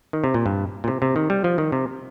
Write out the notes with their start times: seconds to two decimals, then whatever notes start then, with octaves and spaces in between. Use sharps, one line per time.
0.13 D#3
0.24 C3
0.34 A#2
0.46 G2
0.84 A#2
0.88 C3
1.02 C3
1.16 D#3
1.30 G3
1.44 F3
1.58 D#3
1.72 C3